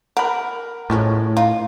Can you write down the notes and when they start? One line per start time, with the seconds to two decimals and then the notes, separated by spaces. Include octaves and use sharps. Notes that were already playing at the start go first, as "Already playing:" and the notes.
0.17 A#4 F#5 B5
0.90 A2 F3 G#3 C#4
1.37 D#4 F4